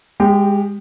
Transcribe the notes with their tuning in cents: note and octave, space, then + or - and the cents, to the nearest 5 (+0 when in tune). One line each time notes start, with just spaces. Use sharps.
G#3 -25 G4 +0